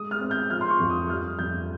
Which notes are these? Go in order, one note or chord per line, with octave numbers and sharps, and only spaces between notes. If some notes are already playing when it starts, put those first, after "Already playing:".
Already playing: G#3 D#6
F6
C4
G6
F3 F6
C6
C#6
F2
D#6
G3 F6
F2 G6